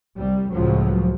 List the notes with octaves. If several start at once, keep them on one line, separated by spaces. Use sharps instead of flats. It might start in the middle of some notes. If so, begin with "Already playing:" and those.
C2 G3
C#2 A2 F3 F#3